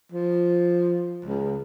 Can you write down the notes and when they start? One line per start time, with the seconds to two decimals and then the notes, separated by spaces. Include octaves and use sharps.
0.12 F3
1.25 C#2